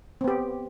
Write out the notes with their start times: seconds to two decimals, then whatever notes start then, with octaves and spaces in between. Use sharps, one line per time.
0.21 C4
0.24 B3
0.28 G4